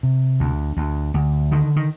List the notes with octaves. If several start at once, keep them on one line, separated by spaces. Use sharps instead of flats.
C3
D2
D2
D2
D3 D#3
D#3